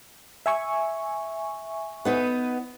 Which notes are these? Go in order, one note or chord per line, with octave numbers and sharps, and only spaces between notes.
E5 G#5 C#6
B3 D#4 B4